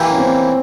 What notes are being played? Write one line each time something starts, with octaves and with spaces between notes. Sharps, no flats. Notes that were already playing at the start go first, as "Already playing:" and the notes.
Already playing: E3 A#3 E4 G4
C#4
C4